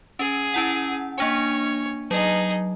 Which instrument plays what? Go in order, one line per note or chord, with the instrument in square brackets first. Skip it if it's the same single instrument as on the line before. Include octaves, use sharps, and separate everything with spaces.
[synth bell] C#4 [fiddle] G#4
[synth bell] C#4 E4 F#5
[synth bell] A#3 D4 G#5 [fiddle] C#5
[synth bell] F#3 [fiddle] D#4 G#4